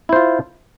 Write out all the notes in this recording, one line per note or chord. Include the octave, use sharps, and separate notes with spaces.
E4 F4 C5